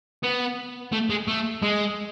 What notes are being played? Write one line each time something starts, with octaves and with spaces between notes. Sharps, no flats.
B3
A3
G#3
A3
G#3